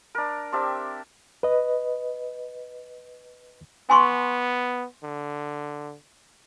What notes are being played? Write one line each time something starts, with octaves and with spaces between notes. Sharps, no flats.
D4 A#4
C4 D4 G4 E5
B4 D#5
B3 G#5 C6 C#6
D3